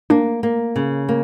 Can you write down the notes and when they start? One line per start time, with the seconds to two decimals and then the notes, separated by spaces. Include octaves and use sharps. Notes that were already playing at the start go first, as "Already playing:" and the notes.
0.10 A#3 D4
0.43 A#3
0.76 C#3
1.09 A#3